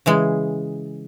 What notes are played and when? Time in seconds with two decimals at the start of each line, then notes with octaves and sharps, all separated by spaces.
0.06 C#3 E3 G#3